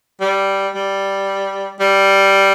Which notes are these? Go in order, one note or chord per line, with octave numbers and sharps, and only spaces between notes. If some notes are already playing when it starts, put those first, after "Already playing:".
G3
G3
G3